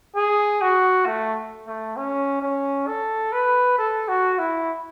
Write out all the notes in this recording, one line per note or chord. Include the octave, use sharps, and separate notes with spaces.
G#4
F#4
A3
A3
C#4
C#4
A4
B4
A4
F#4
E4